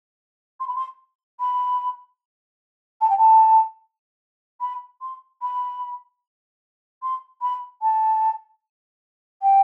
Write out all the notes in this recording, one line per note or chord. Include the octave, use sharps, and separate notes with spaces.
C6
B5
C6
B5
A5
G5
A5
B5
C6
B5
C6
B5
A5
G5